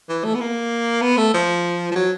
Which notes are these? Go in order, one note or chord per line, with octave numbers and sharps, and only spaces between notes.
E3
A3
B3
A#3
B3
A3
F3
F3
F#3